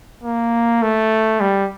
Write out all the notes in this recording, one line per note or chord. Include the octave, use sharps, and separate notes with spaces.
A#3
A3
G3